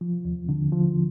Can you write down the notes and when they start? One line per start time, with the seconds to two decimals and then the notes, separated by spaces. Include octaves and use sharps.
0.01 F3
0.25 D#2
0.49 D3
0.72 F3